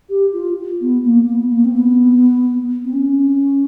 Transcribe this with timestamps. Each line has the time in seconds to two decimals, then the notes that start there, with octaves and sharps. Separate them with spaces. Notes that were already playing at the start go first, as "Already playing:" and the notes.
0.09 G4
0.33 F4
0.81 B3
1.04 A#3
1.28 B3
1.51 A#3
1.65 C4
1.75 B3
2.84 C4
2.93 C#4